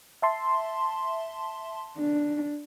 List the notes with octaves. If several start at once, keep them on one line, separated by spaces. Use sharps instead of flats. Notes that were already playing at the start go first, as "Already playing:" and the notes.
E5 A5 C6
D4